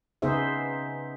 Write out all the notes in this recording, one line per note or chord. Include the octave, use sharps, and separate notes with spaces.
C#3 B3 D#4 G#4 C5 E5